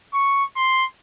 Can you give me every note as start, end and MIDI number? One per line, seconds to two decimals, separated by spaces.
0.13 0.44 85
0.56 0.85 84